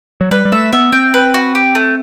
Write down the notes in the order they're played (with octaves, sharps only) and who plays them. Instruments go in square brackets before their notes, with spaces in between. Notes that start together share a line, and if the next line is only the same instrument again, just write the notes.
[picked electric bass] F#3
[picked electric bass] G3 [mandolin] B4
[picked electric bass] G3
[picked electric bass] A3 [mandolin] E5
[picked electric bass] B3 [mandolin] E5
[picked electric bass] C4 [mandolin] G5
[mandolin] B4
F#4
G4
A3